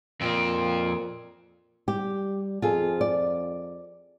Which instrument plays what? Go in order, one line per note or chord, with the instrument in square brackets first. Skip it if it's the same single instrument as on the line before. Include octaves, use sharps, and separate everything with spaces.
[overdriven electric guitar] F2 C4 [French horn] A#2
[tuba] G3 [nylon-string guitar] G4
[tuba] F2 [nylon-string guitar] F4 G#4 A4
[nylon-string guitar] D5